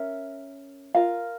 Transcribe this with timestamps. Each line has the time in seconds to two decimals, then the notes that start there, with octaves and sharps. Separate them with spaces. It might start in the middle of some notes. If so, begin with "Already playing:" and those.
Already playing: C#4 A#4 E5
0.94 F4 A#4 F5